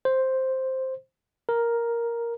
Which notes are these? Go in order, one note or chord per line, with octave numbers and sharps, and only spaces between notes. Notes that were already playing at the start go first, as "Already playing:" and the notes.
C5
A#4